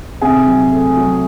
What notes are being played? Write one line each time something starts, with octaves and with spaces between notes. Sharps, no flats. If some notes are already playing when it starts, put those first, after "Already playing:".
C3 G#4 G#5
F#3
A3
F#3